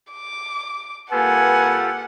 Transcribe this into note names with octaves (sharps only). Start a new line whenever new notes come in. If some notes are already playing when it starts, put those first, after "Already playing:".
D6
C2 A#3 F4 G4 A4 B4 F#5 G#5